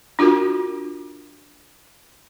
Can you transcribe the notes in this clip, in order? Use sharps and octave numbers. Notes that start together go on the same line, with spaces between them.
D4 F4 F#4 A#4